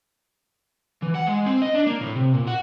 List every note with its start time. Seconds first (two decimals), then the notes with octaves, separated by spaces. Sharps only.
1.03 E3
1.15 F#5
1.27 G#3
1.46 C4
1.62 D#5
1.74 D4
1.86 A#3
2.01 A2
2.15 C3
2.34 A#2
2.47 F#4